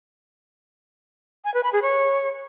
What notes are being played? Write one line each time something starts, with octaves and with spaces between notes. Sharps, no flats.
G#5
B4
B5
G#4
C#5